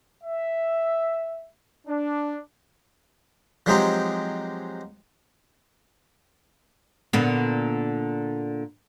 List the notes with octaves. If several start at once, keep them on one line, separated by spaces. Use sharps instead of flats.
E5
D4
F3 F#3 G#3 C4 D#4 G4
A#2 D3 B3